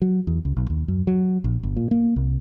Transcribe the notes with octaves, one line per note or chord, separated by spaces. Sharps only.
F#3
E2
C#2
B1
D#2
F#2
F#3
A#1
G1
A#2
A#3
C2